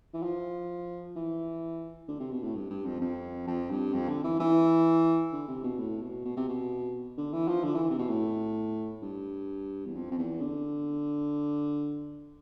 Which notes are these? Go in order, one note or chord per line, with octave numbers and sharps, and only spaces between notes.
E3
F3
E3
D3
C3
B2
A2
G2
G2
F2
F2
F2
G2
F2
D3
E3
E3
D3
C3
B2
A2
B2
B2
C3
B2
D3
E3
F3
D3
E3
C3
B2
A2
G2
E2
F2
F2
E2
D3